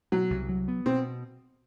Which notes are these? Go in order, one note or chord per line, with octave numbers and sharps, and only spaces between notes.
B2 F#3
C2
F#3
B3
B2 C4